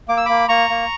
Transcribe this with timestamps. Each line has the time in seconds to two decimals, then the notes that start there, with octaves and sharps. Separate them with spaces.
0.09 A#3 D6
0.17 E6
0.26 A#3 B5 D6
0.48 A#3 A#5 C#6
0.70 A#3